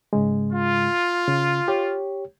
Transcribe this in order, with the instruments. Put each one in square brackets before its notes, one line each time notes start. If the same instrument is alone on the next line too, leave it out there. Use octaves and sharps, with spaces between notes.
[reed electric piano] G#2 C#3 G#3
[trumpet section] F4
[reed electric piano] C#3
G4 C#5